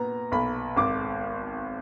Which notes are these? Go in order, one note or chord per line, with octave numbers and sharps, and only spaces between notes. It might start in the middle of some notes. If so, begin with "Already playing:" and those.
Already playing: A#2 B3 A#5
B1 B5
G#1 D6